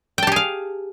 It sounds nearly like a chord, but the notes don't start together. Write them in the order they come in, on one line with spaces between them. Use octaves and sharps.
G5 A5 G4 G#4 F5